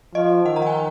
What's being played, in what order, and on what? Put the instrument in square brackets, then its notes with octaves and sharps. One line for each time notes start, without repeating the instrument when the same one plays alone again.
[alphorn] F3 [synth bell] D#5
[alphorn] D#3 [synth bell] F#5
[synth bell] A#5
F#5
G#5